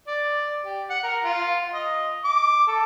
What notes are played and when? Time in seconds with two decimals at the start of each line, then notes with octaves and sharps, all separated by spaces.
0.07 D5
0.65 G4
0.90 F#5
1.03 A#4
1.24 F4
1.73 D#5
2.24 D6
2.67 A4